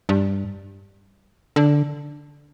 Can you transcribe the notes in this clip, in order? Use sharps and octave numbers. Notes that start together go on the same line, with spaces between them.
G2
D3